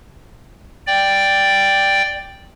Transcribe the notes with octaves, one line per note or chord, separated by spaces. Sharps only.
D5 G5